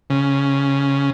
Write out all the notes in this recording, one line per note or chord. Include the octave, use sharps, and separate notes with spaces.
C#3